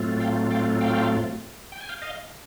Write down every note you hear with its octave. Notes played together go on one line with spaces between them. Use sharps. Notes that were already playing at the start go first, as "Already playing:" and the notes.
Already playing: A2 F#3 A3 C4 F4
F5 G5
F5 G5
F5 G5
G5
G#5
F5 G5
D#5 F5